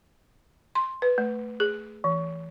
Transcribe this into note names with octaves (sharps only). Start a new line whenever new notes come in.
C6
B4
A3
G#4
E3